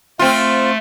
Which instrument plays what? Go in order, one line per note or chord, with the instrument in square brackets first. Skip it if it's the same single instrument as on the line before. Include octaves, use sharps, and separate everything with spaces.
[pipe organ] A3 [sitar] C4 F4